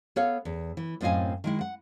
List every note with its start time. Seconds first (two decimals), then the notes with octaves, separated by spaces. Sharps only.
0.16 B3 A4 C#5 F5
0.45 E2
0.77 E3
1.01 F#2 A2 C4 D#5 F5 G#5
1.44 D#3 G#3 E4
1.61 F#5